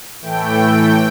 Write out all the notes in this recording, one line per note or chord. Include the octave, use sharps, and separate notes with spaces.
A2 E3 A3 G5